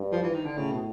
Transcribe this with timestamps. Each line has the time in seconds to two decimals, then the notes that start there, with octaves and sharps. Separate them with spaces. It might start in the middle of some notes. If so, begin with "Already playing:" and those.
Already playing: G2
0.12 F3
0.23 E3
0.34 D#3
0.46 D3
0.57 A2 C#3
0.72 B2